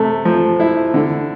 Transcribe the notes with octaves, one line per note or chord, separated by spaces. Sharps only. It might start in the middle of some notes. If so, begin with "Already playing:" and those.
Already playing: C3 A3
F3
E4
D3